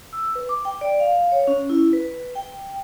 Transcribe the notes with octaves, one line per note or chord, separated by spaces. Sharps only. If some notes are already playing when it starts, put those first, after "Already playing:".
E6
B4
D6
G5
D5
F5
C#5
C#4
E4
B4
G5